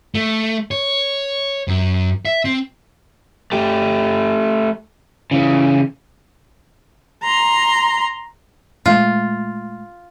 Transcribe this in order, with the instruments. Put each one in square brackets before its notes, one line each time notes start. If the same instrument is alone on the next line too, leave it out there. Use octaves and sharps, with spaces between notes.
[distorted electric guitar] A3
C#5
F#2
E5
C4
[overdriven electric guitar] A3 G4
C#3 E3
[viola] A#5 C6
[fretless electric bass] A#2 G#3 A3 [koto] F4